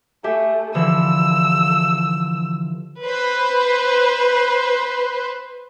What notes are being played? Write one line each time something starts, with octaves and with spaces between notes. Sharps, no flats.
A3 G4 E5 G#5
D3 E3 F3 E6
B4 C5